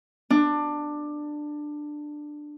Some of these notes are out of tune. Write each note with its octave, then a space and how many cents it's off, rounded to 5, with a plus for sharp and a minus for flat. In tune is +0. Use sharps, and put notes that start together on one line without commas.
D4 +15